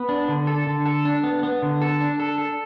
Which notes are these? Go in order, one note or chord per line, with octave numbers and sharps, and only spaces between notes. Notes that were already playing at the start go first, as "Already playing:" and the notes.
Already playing: B3
D4
D3
A4
D3
A4
D4
B3
B3
D3
A4
D4
A4
A4